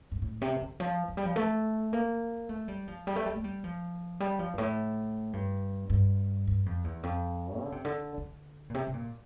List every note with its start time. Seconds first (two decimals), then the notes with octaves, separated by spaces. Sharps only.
0.12 G2
0.22 A2
0.41 C3
0.61 D3
0.80 F3
1.08 F3
1.17 G3
1.25 F3
1.36 A3
1.93 A#3
2.49 A3
2.68 G3
2.88 F3
3.07 G3
3.16 A3
3.26 G3
3.35 A3
3.44 G3
3.64 F3
4.20 G3
4.39 F3
4.54 G2
4.58 A2
5.33 G2
5.90 G2
6.47 G2
6.66 F2
6.84 E2
7.03 F2
7.61 D3
7.72 C3
7.85 D3
8.17 D3
8.70 A#2
8.74 C3
8.87 C3
8.94 A#2